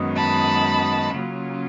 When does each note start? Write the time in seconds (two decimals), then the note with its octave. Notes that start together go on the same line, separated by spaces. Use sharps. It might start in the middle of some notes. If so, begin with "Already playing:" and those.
Already playing: F#2 D#3 G#3 B3
0.15 A5 B5
1.14 C#3 F#3 A#3 C#4 F4